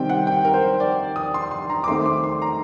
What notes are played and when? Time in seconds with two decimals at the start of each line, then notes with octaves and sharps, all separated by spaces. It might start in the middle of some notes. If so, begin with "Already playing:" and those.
Already playing: C3 D#3 G3 C4 G5
0.09 F#5
0.27 G5
0.45 A#4
0.54 C5
0.80 D5
1.16 D#6
1.34 C6
1.51 C6
1.70 A#5
1.84 D6
1.88 D#3 A3 C4 C6
2.06 D6
2.24 C6
2.42 A#5